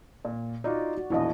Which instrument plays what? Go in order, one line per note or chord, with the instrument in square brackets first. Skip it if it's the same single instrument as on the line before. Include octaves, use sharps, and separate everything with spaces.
[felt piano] A#2
[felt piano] D#4 F4 F#4 [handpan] D5
[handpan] F#4
[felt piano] E1 A#1 F3 [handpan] E4 D#5